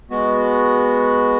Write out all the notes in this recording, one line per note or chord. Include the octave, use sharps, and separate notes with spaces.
G#3 B3 F#4